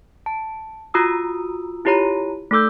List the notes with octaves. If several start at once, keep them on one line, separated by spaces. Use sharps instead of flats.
A5
F4 F#4 A#5 D#6 E6
E4 F4 G4 C#5 A#5 B5
A3 D#4 A4 D6 E6 G6